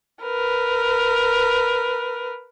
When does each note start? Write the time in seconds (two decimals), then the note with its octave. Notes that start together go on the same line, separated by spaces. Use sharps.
0.23 A#4 B4